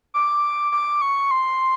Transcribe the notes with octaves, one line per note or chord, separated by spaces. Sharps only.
D6
D6
C#6
C6